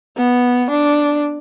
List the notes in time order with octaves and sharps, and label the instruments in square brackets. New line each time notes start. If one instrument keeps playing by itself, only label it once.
[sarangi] B3
D4